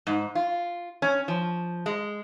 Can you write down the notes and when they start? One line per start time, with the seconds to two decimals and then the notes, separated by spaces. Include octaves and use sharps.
0.07 G#2
0.35 F4
1.02 C#4
1.28 F3
1.86 G#3